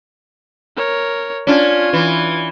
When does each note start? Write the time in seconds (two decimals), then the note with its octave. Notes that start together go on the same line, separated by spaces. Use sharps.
0.77 A#4 C#5
1.47 C#4 D4 F4 G#6
1.93 E3